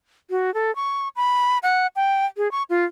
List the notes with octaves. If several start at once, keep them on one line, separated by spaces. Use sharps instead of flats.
F#4
A4
C#6
B5
F#5
G5
G#4
C#6
F4